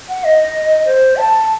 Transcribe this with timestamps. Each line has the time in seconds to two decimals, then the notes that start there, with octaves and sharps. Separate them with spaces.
0.09 F#5
0.24 D#5
0.86 C5
1.17 A5